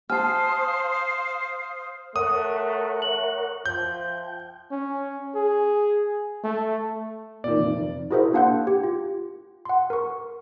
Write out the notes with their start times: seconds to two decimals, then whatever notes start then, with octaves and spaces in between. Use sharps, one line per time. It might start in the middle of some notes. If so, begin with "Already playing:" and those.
0.10 C5 F5 G#5 A5 D#6 F6
2.16 A3 A#4 C#5 F#5 D#6
3.02 E5 F#7
3.66 F3 G5 G6
4.71 C#4
5.35 G#4
6.44 A3
7.44 A#2 D#3 D5
7.57 F1
8.11 E4 F#4 G#4 A#4 C5 E5
8.33 A#3 D4 F5 F#5 C6 G6
8.67 G4
8.83 F4
9.65 F#5 C6
9.90 A#4 C#6